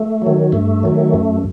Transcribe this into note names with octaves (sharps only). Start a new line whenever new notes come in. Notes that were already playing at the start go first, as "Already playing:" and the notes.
Already playing: A3
D#3 F#3
G2 A3
D#3 F#3
F#2